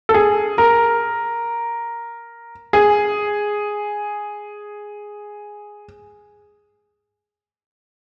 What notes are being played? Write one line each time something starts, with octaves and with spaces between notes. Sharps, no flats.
A4
G#4
A#4
G#4